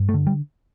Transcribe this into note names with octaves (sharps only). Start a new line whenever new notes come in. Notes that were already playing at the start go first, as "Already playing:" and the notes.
Already playing: G2
A3
D3
G3